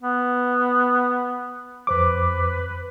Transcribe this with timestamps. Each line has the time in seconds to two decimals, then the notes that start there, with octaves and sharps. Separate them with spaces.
0.03 B3
1.87 F2 B4 C5 D6